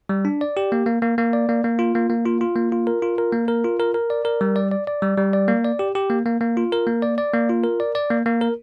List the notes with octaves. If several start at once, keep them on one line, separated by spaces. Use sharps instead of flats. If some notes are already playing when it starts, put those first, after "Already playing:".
G3
D4
D5
G4
A#3
A#3
A#3
A#3
D5
A#3
A#3
F4
A#3
A#3
F4
F4
A#3
F4
A#4
F4
A#4
A#3
A#4
F4
A#4
A#4
D5
A#4
G3
D5
D5
D5
G3
G3
D5
A#3
D5
G4
G4
A#3
A#3
A#3
F4
A#4
A#3
D5
D5
A#3
F4
A#4
D5
D5
A#3
A#3
A#4